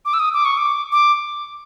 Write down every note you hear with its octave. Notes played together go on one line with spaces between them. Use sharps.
D6
E6
D#6
D6
C#6
D6
D6